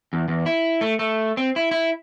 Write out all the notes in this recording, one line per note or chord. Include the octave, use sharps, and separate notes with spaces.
E2
E2
E4
A3
A3
C4
E4
E4